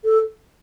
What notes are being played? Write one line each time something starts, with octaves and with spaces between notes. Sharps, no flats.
A4